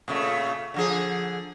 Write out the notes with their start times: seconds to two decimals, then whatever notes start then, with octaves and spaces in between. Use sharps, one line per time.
0.08 A#2 C#3 A3
0.74 D3 F3 G#4